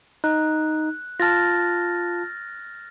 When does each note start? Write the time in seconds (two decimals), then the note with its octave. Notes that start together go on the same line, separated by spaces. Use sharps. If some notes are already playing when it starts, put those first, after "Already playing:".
0.24 D#4 F#6
1.20 F4 A5 F6 A6 A#6